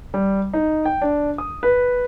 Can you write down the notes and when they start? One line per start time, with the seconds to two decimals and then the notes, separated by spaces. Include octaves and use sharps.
0.14 G3
0.54 D#4
0.85 G5
1.02 D4
1.38 D#6
1.63 B4